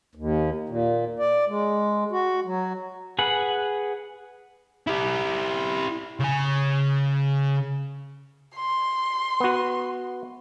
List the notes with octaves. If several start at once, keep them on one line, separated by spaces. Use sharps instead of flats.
D#2
A#2
D5
G#3
F#4
F#3
G#4 B4 F#5
E4 G4
C#3 G#5
C6
B3 F#4